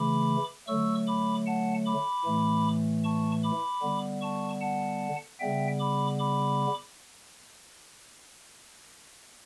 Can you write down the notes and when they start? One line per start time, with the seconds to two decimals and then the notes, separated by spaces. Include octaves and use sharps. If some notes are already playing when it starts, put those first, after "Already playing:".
Already playing: C#3 E3 A3 B5 D6
0.68 D3 F#3 A3 C#6 E6
1.07 B5 D6
1.47 F#5 A5
1.85 B5 D6
2.25 A2 E3 A3
3.04 A5 C#6
3.43 B5 D6
3.82 D3 G3 B3
4.21 A5 C#6
4.61 F#5 A5
5.40 C#3 G3 B3 E5 G5
5.79 B5 D6
6.19 B5 D6